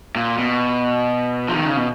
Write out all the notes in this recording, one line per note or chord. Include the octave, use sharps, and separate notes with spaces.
A#2
B2
F3
D#3
C#3
B2